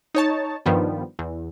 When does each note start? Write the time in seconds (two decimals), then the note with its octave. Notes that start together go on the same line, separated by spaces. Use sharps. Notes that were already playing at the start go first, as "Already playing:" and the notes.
0.15 D#4 C#5 A5
0.66 G2 D#3 F3 G3 B3
1.19 E2